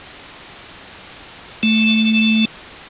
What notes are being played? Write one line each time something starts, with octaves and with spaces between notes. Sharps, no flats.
A3